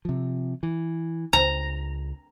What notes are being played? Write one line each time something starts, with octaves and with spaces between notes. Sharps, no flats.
C3 F3
E3
C#2 A#5